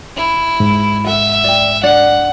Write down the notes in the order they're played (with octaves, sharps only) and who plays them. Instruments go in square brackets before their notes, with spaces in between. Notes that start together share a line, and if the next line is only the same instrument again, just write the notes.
[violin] E4
[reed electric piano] G#2
[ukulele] A4 F#5 [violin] E5
[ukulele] D5 G5
[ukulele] D4 D5 [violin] F#5